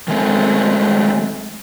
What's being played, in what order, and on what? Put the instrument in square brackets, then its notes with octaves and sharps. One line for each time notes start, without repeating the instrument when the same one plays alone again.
[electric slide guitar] D#3 F#3 G#3 A3 C4